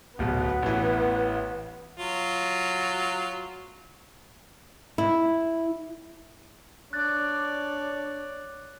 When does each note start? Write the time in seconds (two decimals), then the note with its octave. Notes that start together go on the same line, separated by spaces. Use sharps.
0.19 D1 B1 B2 B3
0.62 A1 E3
1.98 F#3 F4
4.98 E4
6.93 D4 C#5 D5 F#6 A6